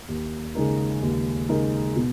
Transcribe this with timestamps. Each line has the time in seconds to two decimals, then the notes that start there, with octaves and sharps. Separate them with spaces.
0.08 D#2
0.55 C#3 G#3 D#4 A#4
1.02 D#2
1.49 C#3 G#3 D#4 A#4
1.96 B2